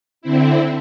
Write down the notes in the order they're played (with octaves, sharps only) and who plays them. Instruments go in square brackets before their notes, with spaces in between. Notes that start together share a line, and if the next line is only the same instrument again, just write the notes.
[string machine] D3 C4 E4